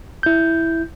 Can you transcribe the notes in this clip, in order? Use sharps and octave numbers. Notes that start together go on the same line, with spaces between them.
E4 G6